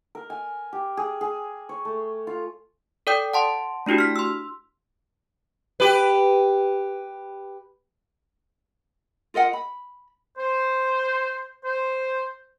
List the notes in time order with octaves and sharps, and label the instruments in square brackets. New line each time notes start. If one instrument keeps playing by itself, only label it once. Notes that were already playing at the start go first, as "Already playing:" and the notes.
[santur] A#4
G#5
G4
G#4
G#4
C#5
A3
F4
[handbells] A4 D5 G5 D#6 G6
F#5 A5 C6
A3 D4 E4 F#4 G4
F6 B6
C6 E6
[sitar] G4 B4
[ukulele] F4 A#4 D#5 F#5
B5
[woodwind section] C5
C5